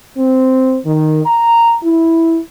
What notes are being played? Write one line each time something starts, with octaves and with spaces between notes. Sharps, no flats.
C4
D#3
A#5
E4